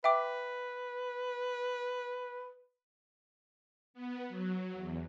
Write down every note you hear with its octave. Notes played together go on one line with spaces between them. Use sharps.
B4 E5 G5 D6
B3
F#3
E2